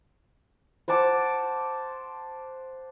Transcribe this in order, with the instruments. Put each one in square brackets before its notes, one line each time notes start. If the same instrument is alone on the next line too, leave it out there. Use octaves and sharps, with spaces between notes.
[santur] C5 F#5 A5 D6